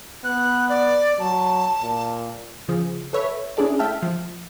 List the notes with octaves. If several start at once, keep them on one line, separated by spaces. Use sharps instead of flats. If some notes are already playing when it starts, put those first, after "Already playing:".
B3 F#6
D5
F#3 A5
A#2
C#3 F3 G#4
A4 B4 C#5 E5
C#4 D4 E4 G#4 A4 D5
A3 E5 G5 A5 F6
F3